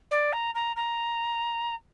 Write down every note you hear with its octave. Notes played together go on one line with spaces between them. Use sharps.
D5
A#5
A#5
A#5